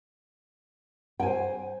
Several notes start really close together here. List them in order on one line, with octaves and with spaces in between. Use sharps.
G5 G#5 C5